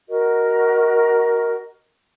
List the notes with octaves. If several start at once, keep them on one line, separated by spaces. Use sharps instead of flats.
F#4 A#4 D#5